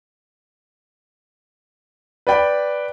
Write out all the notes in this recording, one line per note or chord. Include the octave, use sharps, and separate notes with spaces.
B4 D5 G5 B5